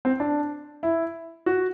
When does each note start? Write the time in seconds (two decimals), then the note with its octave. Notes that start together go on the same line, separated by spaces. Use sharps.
0.05 C4
0.20 D4
0.83 E4
1.46 F#4